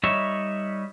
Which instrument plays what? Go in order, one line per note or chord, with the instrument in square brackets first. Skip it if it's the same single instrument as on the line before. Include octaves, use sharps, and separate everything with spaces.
[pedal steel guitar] G3 D#4 C#5 E5